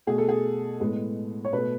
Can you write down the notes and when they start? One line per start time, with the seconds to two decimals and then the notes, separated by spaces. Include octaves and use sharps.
0.07 B2 A3 G#4
0.18 A4
0.29 G#4
0.80 A2 G#3 B3
1.45 C#5
1.53 B2 A3 B4